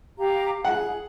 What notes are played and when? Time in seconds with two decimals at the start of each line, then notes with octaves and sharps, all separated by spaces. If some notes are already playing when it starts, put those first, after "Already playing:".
0.18 G4 F5 A#5
0.65 G#4 F#5